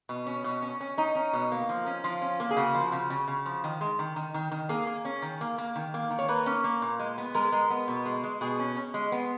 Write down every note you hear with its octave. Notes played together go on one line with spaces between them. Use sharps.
B2
C#4
B2
C#4
C#4
C#4 D#4
C#4
B2
A#3
F3
C#4
F3 F4
C#4
A#3
G#4
C#3 F#4
F3
C#3
C#3
C#3
F3
D#3
G#3
D#3
D#3
D#3
D#3
A#3 G#4
A#3
C#4
D#3
A#3
A#3
D#3
A#3
D#3
C#5
A#3 B4
C#4
A#3
A#2
G#3
B3
G#3 A#4
G#3
B3
B2
G#3
G#3
B2 G#4
C#4
C#4
G#3
B3